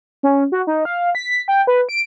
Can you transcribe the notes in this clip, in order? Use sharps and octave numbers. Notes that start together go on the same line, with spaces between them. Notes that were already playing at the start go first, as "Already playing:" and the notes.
C#4
F#4
D#4
F5
B6
G5
B4
D7